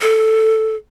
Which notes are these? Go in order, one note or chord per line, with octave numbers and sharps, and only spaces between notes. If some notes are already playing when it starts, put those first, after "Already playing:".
A4